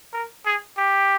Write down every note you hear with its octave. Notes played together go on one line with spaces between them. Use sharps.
A#4
G#4
G4